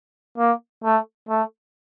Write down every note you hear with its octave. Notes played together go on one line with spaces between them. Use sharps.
A#3
A3
A3